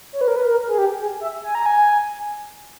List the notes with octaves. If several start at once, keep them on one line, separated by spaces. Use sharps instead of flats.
C#5
B4
A#4
B4
A#4
G#4
G4
G#4
E5
G#5
A#5
G#5